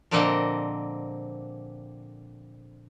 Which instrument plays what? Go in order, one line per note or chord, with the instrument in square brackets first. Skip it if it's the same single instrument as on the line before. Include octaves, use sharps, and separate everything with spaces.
[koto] A#2 D3 F3 A#3 C4 D#5